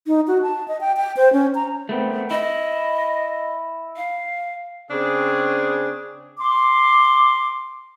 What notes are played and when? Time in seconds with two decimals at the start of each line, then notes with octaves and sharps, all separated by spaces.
0.07 D#4
0.28 F#4
0.42 A5
0.68 D#5
0.81 G5
0.97 G5
1.17 C5
1.33 C#4
1.55 A#5
1.89 A3 B3 C4
2.31 E4 D#5
3.96 F5
4.91 C#3 C4 D4 G#4
6.39 C6 D6